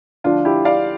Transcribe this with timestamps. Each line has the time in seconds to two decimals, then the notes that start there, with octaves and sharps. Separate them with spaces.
0.24 D2 D3 F3 D4 F4
0.45 E4 G4
0.65 D5 F5